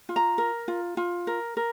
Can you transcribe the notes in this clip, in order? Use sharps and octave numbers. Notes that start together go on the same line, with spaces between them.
F4
A#5
A#4
F4
F4
A#4
A#4